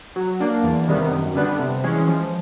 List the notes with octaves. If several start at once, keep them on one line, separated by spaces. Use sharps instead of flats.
F#3
A#3 D4
E2
C3 D#3 G3 B3
F#2
D3 G3 B3 D4
C3
E3 G#3 C#4
F3